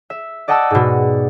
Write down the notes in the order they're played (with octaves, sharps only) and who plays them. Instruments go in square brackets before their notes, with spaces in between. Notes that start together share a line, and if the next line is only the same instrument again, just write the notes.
[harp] E5
D5 D#5 F#5 G5 A5 E6
G#2 B2